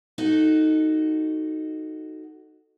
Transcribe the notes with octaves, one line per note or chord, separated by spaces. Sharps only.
D#4 F#4 A4